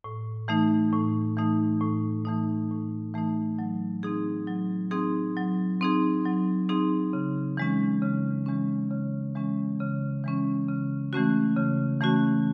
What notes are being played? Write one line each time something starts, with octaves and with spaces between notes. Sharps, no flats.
A2
E3 A3 D#4
A2
E3 A3 D#4
A2
E3 A3 D#4
A2
E3 A3 D#4
F#3
C4 D#4 G#4
F#3
C4 D#4 G#4
F#3
C4 D#4 G#4
F#3
C4 D#4 G#4
C#3
E3 G#3 C#4
C#3
E3 G#3 C#4
C#3
E3 G#3 C#4
C#3
E3 G#3 C#4
C#3
E3 A3 C#4 F#4
C#3
E3 A3 C#4 F#4